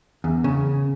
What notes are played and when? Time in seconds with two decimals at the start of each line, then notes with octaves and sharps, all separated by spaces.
0.24 E2
0.44 C#3